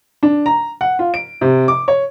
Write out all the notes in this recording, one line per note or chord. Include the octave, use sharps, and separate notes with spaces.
D4
A#5
F#5
F4
D7
C3
D6
C#5